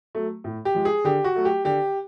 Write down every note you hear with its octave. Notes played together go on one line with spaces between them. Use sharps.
F#3 A3
A2
G4
F3 G#3
G#4
D3 G4
F#4
F#3 A3
G4
D3 G4